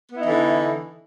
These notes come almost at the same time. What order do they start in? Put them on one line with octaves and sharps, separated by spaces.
B3 E4 D#4 E3 D3